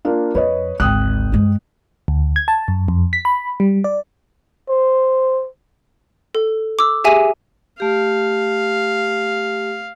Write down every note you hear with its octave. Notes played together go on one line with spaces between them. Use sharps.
A#3 D4 F4
F2 B4 C#5 D#5
G#1 D2 G5 D#6 F#6
G2 G#3
D2
G#6
A5
F#2
F2
B6
B5
G3
D5
C5
A4
D6 E6
G4 G#4 E5 G#5 D#7
A3 G4 F5